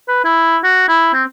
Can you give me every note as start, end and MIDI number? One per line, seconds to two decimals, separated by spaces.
0.08 0.21 71
0.24 0.57 64
0.64 0.87 66
0.88 1.11 64
1.14 1.24 60